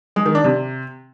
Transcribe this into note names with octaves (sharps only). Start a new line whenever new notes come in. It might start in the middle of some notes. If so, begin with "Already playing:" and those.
G#3
D#3
D4
C3